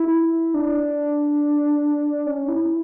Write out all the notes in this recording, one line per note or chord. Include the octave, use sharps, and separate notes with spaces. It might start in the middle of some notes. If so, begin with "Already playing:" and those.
Already playing: E4
D4
C#4
E4